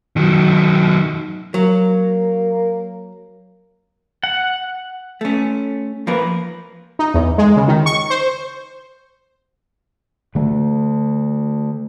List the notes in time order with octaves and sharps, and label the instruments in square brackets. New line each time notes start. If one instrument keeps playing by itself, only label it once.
[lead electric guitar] D#3 F#3
[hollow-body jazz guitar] F#3 [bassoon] A#3
[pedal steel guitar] F#5
[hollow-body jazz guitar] A3 C#4
F3 A#3 A#4 B4
[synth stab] D#4
E2
G#3
C#3
D#3
C#6
C5
[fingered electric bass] D3 A3